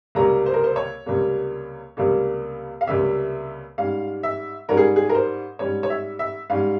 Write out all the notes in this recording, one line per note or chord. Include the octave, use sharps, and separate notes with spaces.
C#2 C3 G3 A#3 C#4 A#5
C5
A#4
C5
C#5
C#2 C3 G3 A#3 C#4
C#2 C3 G3 A#3 C#4
F5
C#2 C3 G3 A#3 C#4 E5
G#2 G3 C#4 F5
E5
G#2 G3 C#4 A#4
G#4
G#4
A#4
C5
G#2 G3 C#4 C#5
C#5
E5
E5
G#2 G3 C#4 F5